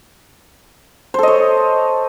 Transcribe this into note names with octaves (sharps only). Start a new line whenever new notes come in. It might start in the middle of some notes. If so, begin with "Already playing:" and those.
A4 C5 C#5 D#5